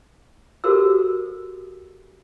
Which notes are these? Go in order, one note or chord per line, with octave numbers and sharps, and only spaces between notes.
F#4 G4 A4 A#4 C5 E6